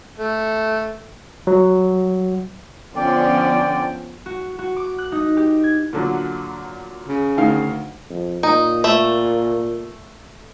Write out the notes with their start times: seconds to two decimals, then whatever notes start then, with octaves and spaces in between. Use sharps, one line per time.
0.18 A3
1.47 F#3
2.95 D3 F3 B3 C#4 D5 G5
4.26 F#4
4.59 F#4
4.77 D6
4.98 F#6
5.12 D#4
5.37 G4
5.64 G#6
5.93 A#2 D3 F#3
7.08 C#3
7.38 D2 D#3 F5
8.10 F2
8.43 A#2 D#4
8.84 A3 E5